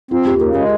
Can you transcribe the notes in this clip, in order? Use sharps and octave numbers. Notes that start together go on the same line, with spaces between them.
C4 F4
D#2 G4
C#3 A#4
G#3 G#4